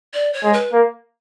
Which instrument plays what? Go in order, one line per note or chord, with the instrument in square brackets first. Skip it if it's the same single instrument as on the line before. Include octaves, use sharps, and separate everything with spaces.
[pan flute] D5
C#5
[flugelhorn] G#3
[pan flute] B4
[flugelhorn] A#3